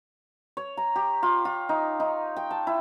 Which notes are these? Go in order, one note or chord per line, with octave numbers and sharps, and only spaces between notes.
C#5
A#5
G4
F4
F4
D#4
D#4
G5
A5
E4